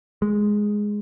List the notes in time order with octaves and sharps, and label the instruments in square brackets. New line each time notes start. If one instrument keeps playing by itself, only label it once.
[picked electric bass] G#3